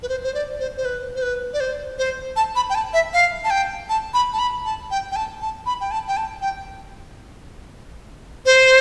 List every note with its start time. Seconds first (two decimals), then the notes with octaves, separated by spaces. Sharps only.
0.03 B4
0.09 C5
0.24 C5
0.34 D5
0.60 C5
0.77 C5
0.85 B4
1.16 C5
1.22 B4
1.53 D5
1.60 C5
1.98 C5
2.36 A5
2.56 B5
2.70 G5
2.75 A5
2.93 E5
3.13 F5
3.44 A5
3.50 G5
3.89 A5
4.14 B5
4.33 A5
4.39 B5
4.65 A5
4.91 G5
5.11 G5
5.16 A5
5.41 A5
5.66 B5
5.81 G5
5.91 A5
6.08 G5
6.17 A5
6.42 G5
8.46 C5